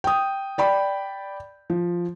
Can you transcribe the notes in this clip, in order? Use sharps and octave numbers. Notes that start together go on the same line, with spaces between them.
G5 D#6
D5 G5 B5
F3